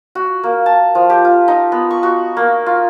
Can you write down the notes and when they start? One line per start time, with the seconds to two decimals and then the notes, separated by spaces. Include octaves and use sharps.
0.15 F#4
0.43 A#3
0.66 A5
0.95 F3
1.10 G4
1.25 F4
1.48 D#4
1.72 B3
1.90 C#6
2.03 F#4
2.37 A#3
2.66 F4